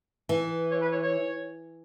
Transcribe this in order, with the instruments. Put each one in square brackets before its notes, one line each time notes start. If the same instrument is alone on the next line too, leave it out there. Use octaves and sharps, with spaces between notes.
[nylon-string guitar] E3
[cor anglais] C#5
B4
C#5
C#5